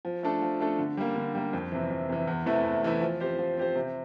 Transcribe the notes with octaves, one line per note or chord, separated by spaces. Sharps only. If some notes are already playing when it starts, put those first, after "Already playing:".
F3
A3 D4 A4
F3
A3 D4 A4
D3
G3 A#3
D3
G3 A#3
F2
C3 E3
F2
C3 E3
E2
C3 E3 A3 E4
E2
C3 E3 A3 E4
F3
C4 G4 C5
F3
C4 G4 C5
C3